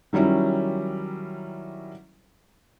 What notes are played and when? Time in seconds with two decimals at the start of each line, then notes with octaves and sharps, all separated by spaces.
0.13 D#3 F#3 G3 C#4 E4